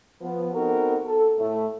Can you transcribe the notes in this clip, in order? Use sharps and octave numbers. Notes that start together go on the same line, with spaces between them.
F3 B3
B3 C4 D#4 F#4 A4 A#4
A4
A2 A3